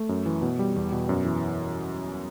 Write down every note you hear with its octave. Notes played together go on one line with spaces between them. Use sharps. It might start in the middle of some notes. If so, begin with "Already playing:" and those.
Already playing: A3
F#2
E3
B2
G3
E2
B2
F#2
E3